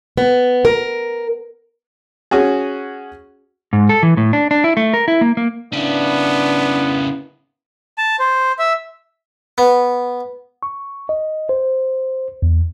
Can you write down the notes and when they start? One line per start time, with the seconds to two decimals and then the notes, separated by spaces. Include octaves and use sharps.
0.17 B3
0.65 A#4
2.31 C#4 F#4 G#4
3.73 G#2
3.89 A4
4.03 E3
4.17 A2
4.33 D4
4.51 D4
4.64 E4
4.77 A3
4.94 A#4
5.08 E4
5.21 A#3
5.37 A#3
5.73 C#3 B3 D4 E4
7.98 A5
8.20 C5
8.59 E5
9.58 B3
10.63 C#6
11.09 D#5
11.49 C5
12.42 E2